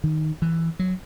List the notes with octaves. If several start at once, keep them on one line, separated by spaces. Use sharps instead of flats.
D#3
E3
F#3